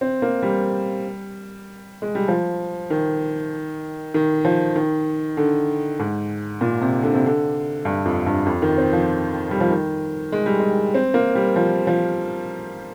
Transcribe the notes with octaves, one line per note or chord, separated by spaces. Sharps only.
C4
A#3
G3
G#3
G3
F3
D#3
D#3
F3
D#3
D3
G#2
A#2
C3
D3
C3
D3
G2
F2
G2
F2
D#3
C4
F3
G3
F3
D#3
G#3
G3
G#3
C4
A#3
G3
F3
F3